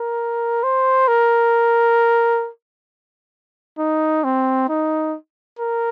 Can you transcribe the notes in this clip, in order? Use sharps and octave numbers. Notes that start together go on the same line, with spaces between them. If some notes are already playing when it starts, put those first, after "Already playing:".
Already playing: A#4
C5
A#4
D#4
C4
D#4
A#4